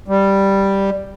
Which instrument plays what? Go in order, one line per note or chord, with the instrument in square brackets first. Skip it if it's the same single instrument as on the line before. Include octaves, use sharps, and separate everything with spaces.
[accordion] G3